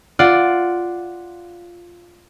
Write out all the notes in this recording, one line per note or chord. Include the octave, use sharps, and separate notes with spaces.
F4 D5 F#5